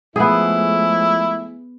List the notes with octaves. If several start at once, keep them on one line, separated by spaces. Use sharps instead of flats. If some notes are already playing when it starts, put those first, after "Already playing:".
F3 G#3 A3 B3 E4 G#4